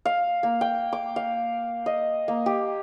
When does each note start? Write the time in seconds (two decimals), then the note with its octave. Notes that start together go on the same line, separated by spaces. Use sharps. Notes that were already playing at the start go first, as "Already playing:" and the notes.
0.05 F5
0.43 A#3
0.61 G5
0.93 D6
1.16 F5
1.86 D#5
2.28 A#3
2.46 G4